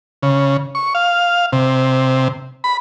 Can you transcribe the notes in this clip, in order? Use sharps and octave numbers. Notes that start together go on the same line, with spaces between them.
C#3
C#6
F5
C3
B5